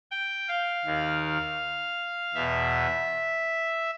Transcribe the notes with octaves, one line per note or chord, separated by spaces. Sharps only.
G5
F5
D#2 D#3
E2 B2 E5